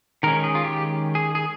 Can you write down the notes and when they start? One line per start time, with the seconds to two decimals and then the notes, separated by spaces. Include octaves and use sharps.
0.23 D#3 G#3 C#4 A#4
0.44 G#4
0.55 F4
0.64 G4
1.15 G#4
1.35 G#4